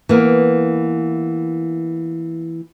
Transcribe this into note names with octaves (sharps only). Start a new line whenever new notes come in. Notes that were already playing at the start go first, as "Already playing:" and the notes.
E3 A#3 B3